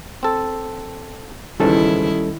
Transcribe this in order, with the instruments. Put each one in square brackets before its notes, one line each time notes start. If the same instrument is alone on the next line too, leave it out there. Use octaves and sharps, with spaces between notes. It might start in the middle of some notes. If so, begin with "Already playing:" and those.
[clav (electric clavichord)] C4 A4
[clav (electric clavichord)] C#2 G#2 E3 [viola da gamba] D#3 E4 [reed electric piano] G3 C#4 A4